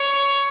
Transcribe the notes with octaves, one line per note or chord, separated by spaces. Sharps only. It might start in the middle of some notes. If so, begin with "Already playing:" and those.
Already playing: C#5